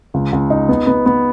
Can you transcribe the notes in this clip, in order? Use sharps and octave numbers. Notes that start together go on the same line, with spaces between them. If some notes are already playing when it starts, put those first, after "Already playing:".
C#2
C#2
D#4
B3
B3
B3